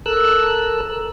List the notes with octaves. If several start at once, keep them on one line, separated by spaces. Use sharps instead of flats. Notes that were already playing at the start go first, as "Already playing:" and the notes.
A4 A#4 E6 F#6